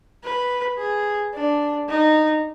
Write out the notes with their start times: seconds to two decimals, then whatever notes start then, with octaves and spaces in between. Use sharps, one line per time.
0.24 B4
0.78 G#4
1.35 D4
1.89 D#4